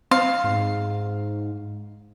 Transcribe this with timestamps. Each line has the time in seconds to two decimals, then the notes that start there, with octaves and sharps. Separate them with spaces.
0.11 C4 F5
0.44 G#2